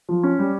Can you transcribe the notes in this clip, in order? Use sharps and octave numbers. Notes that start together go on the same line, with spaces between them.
F3
C#4
G3